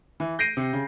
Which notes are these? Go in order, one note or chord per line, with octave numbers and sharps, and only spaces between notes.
E3
G6 A#6 C7 D7 D#7
C3
C#3